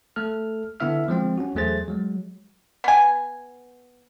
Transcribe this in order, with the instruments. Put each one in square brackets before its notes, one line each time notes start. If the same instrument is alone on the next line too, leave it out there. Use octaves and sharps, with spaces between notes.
[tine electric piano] A3 A4 F6
D3 B3 E4 E5 F6
F3 G#3 C4 F4
C#4 F#4
E2 F#3 A3 G#4 C5 A6
F#3 G#3
[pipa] B3 G#5